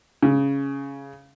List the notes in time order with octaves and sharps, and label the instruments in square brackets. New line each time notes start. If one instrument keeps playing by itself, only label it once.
[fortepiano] C#3